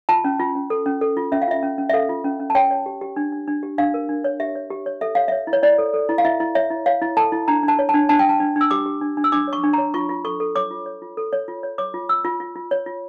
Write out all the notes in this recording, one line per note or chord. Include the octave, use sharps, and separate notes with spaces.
F4 A5
C#4
F4
C#4
A4
C#4
A4
F4
C#4 E5
F5
F4 E5
C#4
C#4
E5
A4 F5
F4
C#4
C#4
A5
C#5 G5
C#5
G4
G4
D4
D4
D4
G4
D4 F5
A#4
D4
C#5
G4 E5
C#5
G4
C#5
A4 E5
C#5 F5
C#5 E5
E4
C#5
E4 D5
A4
A4
E4
F5
E4 E5
E4
C#5 E5
E4
C#5 F5
E4
A4 A5
E4
D4 A#5
D4
A5
C#5
A5
D4
D4 A5
G5
D4 A5
D4
D4
E6
G4 D6
G4
D4
D4
E6
D4 D6
C#5
C#6
D4
C#5 A#5
F4 C#6
F4
A4 C#6
A4
C#5 D6
F4
C#5
F4
A4
C#5
F4
C#5
C#5 D6
F4
F4 E6
F4
F4
F4
C#5
F4